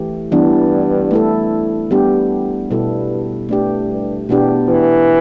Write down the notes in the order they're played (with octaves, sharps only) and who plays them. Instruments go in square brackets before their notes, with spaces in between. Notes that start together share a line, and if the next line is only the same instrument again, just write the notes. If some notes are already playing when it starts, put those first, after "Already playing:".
Already playing: [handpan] E3 A3 G4
[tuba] G2 [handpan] E3 G3 B3 D4
[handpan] A3 E4 A4
G3 B3 D4 G4
[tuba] G2 [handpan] B2 G3 E4 A4
[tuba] G2 [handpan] A3 D4 G4
[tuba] G2
[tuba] E2 [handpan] B2 B3 D4 G4
[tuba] E3